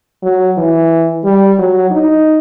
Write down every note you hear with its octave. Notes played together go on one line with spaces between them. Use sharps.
F#3
E3
G3
F#3
D#4